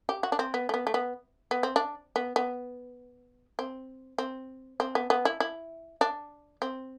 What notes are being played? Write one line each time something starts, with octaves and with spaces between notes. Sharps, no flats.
G4
F#4
D4
C4
B3
A3
B3
A3
B3
B3
C4
D4
B3
B3
C4
C4
C4
B3
B3
E4
E4
D4
C4